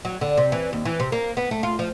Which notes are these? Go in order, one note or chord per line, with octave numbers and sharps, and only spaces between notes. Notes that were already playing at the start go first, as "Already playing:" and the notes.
F#3
D3
C3
E3
D#2
E3
C3
A#3
B3
A3
F4
F3